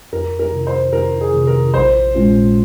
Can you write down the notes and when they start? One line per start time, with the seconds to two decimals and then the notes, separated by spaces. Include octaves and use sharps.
0.13 F2 A#4
0.39 A#4
0.52 C3 D#3
0.67 C5
0.93 F2 A#4
1.21 G#4
1.34 C3 D#3
1.47 A#4
1.74 A#1 C5
2.15 A#2 G#3 C#4 F4